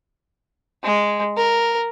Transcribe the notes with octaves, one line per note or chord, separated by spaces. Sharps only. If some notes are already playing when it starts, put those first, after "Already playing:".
G#3
A#4